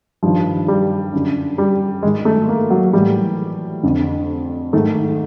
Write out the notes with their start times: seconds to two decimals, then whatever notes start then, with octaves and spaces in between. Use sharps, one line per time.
0.23 G2 D#3 F3
0.68 G3
1.13 F#2 D3
1.58 G3
2.03 G#2 D#3 G#3
2.25 A3
2.48 A#3
2.70 F#3
2.93 A2 E3 G3
3.83 F2 D3
4.73 G#2 D#3 A3